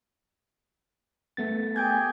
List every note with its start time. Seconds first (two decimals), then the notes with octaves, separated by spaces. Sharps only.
1.37 A3 B3 A6
1.76 G4 G#4 G5 G#5 G6 G#6